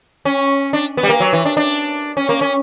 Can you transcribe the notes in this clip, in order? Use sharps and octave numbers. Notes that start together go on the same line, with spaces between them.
C#4
D4
B3
G3
A#3
F#3
E3
D4
D4
C#4
A#3
C#4